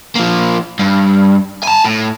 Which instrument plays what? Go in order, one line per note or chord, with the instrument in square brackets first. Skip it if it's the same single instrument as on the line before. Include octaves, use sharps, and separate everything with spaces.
[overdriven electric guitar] F3 A#3
G2
G#5 A5
A2